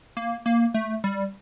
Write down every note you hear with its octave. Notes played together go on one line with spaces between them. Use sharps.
A#3
A#3
A3
G3